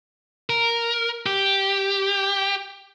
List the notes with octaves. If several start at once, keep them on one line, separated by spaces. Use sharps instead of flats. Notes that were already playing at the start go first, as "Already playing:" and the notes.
A#4
G4